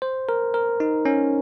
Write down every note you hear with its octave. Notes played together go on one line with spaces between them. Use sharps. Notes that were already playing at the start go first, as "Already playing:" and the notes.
C5
A#4
A#4
D#4
C#4